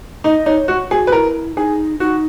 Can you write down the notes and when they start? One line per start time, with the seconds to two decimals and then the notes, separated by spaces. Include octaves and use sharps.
0.24 D#4 D#5
0.46 D#4 C#5
0.68 F#4
0.91 F#4 G#4
1.07 B4
1.12 E4 A#4
1.56 D#4 G#4
2.00 D#4 F#4